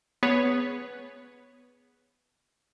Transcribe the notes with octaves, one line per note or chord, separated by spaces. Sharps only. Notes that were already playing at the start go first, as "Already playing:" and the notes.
B3 G#4 B4 C#5